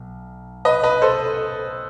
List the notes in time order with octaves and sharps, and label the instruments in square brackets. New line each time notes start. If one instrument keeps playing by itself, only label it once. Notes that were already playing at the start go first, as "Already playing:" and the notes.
Already playing: [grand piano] B1
B4 D#5
B4 D#5
A4 C5